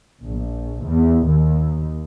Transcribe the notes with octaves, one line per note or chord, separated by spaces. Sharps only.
A#1
E2
D#2